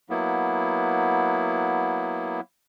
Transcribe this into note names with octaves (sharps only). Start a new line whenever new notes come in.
F#3 A#3 B3 E4